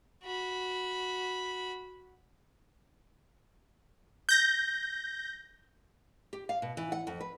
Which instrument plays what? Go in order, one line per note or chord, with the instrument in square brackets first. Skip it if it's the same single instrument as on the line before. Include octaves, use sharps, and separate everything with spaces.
[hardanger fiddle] F#4 B5
[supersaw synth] G6 A#6
[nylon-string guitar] G4
F5
B2
E3
F#5
F2
B4